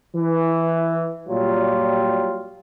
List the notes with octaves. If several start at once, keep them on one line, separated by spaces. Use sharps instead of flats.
E3
A#2 F#3 G3 F4 G4